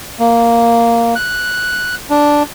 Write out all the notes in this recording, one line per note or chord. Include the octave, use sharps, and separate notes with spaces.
A#3
F#6
D4